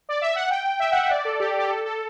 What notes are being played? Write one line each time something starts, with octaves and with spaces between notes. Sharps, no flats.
D5
E5
F#5
G5
E5
F#5
E5
D5
A4
G4
G4
A4
A4